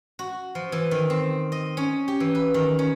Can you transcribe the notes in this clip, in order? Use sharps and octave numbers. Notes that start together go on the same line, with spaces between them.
F#4
F3
E3
D#3
C4
D#5
C#4
G4
E3
B4
D#3
C#4